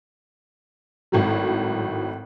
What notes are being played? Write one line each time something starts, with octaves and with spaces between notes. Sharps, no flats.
G#1 A2 F#3